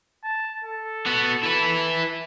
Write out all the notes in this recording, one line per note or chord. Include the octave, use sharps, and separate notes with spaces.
A5
A4
B3 F#4
E4 B4